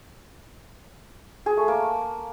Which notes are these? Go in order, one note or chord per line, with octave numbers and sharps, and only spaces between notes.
G#4
A3
A#3